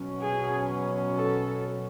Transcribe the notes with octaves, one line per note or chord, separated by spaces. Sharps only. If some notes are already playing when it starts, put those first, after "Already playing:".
Already playing: B2 F#3 C#4
G#4
A4